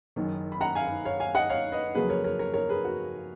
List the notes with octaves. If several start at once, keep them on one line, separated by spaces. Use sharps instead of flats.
F#1 F#2 D#3
B5
F#5 A#5
F5 G#5
C#5 F5
F5 G#5
D#5 F#5
C#5 F5
B4 D#5
F2 C#3 F#3 A#3 G#4 B4
A#4 C#5
A#4 C#5
A#4 C#5
A#4 C#5
G#4 B4
F#4